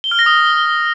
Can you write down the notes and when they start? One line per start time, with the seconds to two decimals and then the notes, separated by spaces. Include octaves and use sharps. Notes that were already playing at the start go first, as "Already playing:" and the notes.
0.04 G7
0.11 F6
0.19 A#6
0.26 D#6